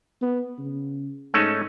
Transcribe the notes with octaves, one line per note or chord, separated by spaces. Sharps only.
B3
C#3
G#2 A3 C#4 D#4